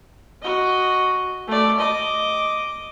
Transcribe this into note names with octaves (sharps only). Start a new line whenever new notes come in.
F#4 D#5
A3 D5
D#5 D6